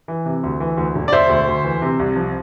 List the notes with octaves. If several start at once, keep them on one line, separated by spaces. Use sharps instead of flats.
E3
C3
D2
E3
D2
E1
D5
E1 C5 E5
D2
D2
E3
C3
C2
F3